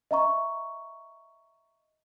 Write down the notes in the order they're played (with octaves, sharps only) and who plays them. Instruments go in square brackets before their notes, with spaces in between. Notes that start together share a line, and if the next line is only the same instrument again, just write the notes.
[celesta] D#5 E5 A#5 C#6